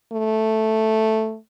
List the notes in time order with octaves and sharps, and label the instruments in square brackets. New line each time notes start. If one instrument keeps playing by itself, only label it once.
[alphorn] A3